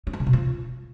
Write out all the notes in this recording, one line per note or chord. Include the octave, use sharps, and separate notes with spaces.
C#4
D#4
C#3
B2
F4